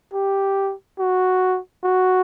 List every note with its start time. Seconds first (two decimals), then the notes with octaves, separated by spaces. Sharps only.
0.13 G4
0.99 F#4
1.83 F#4